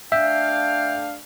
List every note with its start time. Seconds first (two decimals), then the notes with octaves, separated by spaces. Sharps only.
0.12 A3 D4 E5 F5 G5